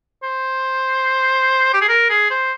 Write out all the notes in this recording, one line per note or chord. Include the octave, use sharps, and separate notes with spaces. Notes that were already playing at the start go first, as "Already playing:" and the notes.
C5
G4
G#4
A#4
G#4
C5